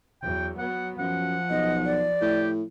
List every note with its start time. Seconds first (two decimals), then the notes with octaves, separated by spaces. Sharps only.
0.22 E2 F#3 G5
0.58 F#3 B3 F#5
0.99 F#2 F3 F#5
1.50 B1 D#5
1.85 D5
2.21 A2 G4